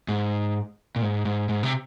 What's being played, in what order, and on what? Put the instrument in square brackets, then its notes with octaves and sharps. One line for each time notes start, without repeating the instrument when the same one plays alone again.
[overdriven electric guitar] G#2
A#2
G#2
G#2
G#2
C3